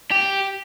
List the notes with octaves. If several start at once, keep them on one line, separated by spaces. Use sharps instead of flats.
G4